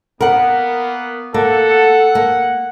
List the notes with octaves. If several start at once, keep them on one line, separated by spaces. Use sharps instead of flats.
A#3 B3 A#4 F#5
A#3 A4 F#5
A#3